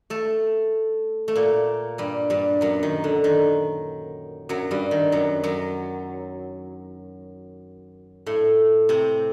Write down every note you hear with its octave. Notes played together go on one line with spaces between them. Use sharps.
A3 A4
A3
A#2 A#3
G2 G3
G2 G3
F#2 F#3
D#3
D3
D#3
F#2 F#3
G2 G3
D#3
F#2 F#3
F#2 F#3
A2 A3
C3 C4